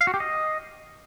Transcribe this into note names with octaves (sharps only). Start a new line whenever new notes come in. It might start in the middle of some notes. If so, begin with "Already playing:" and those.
F5
F#4
G4
D#5